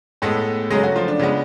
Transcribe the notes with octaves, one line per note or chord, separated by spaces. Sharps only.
A2 G#3 A3 B3 A4
C#3 F#3 G#3 A3 G#4
F#3 F#4
F3 F4
D4
C#3 G#3 B3